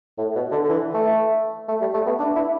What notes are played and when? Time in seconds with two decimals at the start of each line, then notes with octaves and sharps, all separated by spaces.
0.18 A2
0.35 B2
0.51 D3
0.64 D3
0.69 E3
0.94 A3
1.68 A3
1.81 G3
1.94 A3
2.06 B3
2.19 D4
2.36 E4